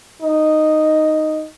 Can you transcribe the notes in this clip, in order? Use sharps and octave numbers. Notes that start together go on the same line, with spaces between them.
D#4